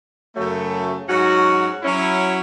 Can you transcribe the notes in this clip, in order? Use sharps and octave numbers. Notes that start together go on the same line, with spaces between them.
F#2 C#3 F#3 A3
G#2 F#3 C#4 F#4
F#3 C#4 E4